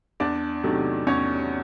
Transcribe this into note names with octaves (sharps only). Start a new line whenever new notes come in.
E2 D4 D5
C3 D#3 F#3 A3
E2 C#4 C#5